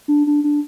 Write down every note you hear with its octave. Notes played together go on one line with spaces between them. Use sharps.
D4
D4
D4